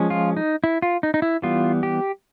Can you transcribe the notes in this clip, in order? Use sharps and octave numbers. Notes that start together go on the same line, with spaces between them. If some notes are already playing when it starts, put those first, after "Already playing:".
Already playing: F3 G#3 C#4
F4
D#4
E4
F4
D#4
D#4
E4
E3 G3 B3 F4
G4